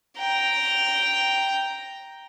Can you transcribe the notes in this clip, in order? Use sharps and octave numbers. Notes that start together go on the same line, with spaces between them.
G5 A#5